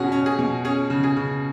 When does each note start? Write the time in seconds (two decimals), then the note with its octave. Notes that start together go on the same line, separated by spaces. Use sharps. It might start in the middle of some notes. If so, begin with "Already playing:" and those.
Already playing: B2 C#4 F#4 G#4
0.12 C#4
0.26 G#4
0.38 B2
0.65 C#4 G#4
0.90 C#3
1.04 G#4
1.17 C#3